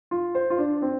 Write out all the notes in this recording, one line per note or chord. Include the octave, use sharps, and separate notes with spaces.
F4
C5
F4
D4
C4